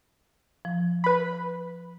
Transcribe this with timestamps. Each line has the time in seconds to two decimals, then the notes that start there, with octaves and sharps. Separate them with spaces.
0.65 F3
1.04 B4 B5